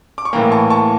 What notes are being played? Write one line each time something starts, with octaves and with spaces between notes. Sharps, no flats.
D6
C#6
A2 E3 A#3 G5 A#5
A5 C#6
A5 C#6